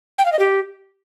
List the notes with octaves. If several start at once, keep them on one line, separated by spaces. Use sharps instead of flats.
G5
F5
D#5
G4